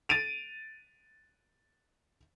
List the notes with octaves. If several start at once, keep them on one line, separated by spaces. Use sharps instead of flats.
A6 D7 D#7 F7